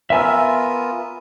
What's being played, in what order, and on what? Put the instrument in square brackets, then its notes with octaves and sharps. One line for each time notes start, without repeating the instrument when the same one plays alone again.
[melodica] B3 F4 A#4 [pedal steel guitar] E5 G#5 E6